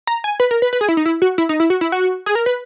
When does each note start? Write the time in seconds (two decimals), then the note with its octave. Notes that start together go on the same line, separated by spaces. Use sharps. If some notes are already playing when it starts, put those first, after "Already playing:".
0.07 A#5
0.24 G#5
0.40 B4
0.51 A#4
0.62 B4
0.73 B4
0.81 G#4
0.88 E4
0.97 D#4
1.06 E4
1.22 F#4
1.38 E4
1.49 D#4
1.60 E4
1.70 F#4
1.81 E4
1.92 F#4
2.26 G#4
2.35 A#4
2.46 B4